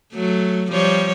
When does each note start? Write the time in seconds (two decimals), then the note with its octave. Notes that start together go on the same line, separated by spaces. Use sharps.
0.15 F#3 A3
0.71 F3 G3 C#5